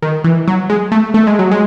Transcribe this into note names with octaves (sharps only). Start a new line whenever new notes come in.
D#3
E3
F#3
G#3
A3
A3
G#3
F#3
G#3